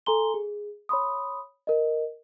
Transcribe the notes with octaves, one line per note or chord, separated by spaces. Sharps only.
A4 G#5 A#5 C6 G7
G#4
C#5 B5 C6 D#6
A#4 D#5